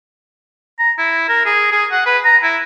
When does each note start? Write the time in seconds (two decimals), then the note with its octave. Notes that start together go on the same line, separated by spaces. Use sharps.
0.79 A#5
0.98 E4
1.29 A#4
1.45 G#4
1.72 G#4
1.92 F#5
2.06 B4
2.25 A#5
2.43 E4